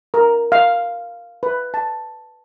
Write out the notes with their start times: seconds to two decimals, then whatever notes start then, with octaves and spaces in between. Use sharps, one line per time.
0.14 A#4
0.52 F5
1.43 B4
1.74 A5